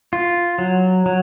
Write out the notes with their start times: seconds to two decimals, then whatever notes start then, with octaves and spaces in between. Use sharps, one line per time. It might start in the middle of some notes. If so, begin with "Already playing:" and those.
0.13 F4
0.58 F#3
1.06 F#3